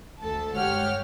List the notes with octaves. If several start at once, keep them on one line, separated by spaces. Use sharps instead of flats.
D2 A4 A5
G1 G#3 G4 C#5 F#5 F6